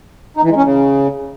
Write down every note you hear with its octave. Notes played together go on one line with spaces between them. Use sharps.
D#4
E3
G#3
C#4
C#3